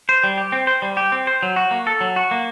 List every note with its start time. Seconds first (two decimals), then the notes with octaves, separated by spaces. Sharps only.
0.09 C5
0.24 G3
0.38 G4
0.52 C4
0.67 C5
0.82 G3
0.97 G4
1.12 C4
1.27 C5
1.42 F#3
1.56 F#4
1.71 A#3
1.87 A4
2.01 F#3
2.16 F#4
2.31 A#3